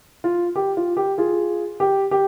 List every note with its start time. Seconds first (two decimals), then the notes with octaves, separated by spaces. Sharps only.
0.24 F4
0.56 G4
0.77 F4
0.97 G4
1.18 F4 G#4
1.80 G4
2.11 G4